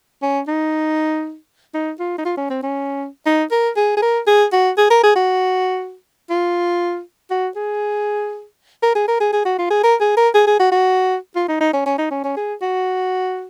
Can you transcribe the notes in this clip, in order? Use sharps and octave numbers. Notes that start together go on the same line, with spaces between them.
C#4
D#4
D#4
F4
D#4
F4
C#4
C4
C#4
D#4
A#4
G#4
G#4
A#4
G#4
F#4
G#4
A#4
G#4
F#4
F4
F#4
G#4
A#4
G#4
A#4
G#4
G#4
F#4
F4
G#4
A#4
G#4
A#4
G#4
G#4
F#4
F#4
F4
D#4
D#4
C#4
C#4
D#4
C#4
C#4
G#4
F#4